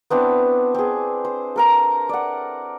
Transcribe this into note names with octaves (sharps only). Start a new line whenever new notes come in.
B3 C4 D4 E4
C4 G#4
C5
A4 A#4 A#5
D5 F#5